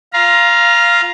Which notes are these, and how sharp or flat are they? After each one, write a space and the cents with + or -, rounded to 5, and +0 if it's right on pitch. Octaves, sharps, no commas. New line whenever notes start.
F4 +0 F5 -10 A#5 +20